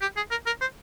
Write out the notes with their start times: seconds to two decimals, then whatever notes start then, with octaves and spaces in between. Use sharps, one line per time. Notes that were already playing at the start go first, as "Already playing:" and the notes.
0.01 G4
0.17 G#4
0.31 A#4
0.46 A#4
0.61 C5